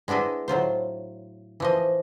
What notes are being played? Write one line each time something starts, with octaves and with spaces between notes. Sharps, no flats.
G#3 B3 D4 E4 D#5
A2 F#3 F4 C5
E3 F3 D#5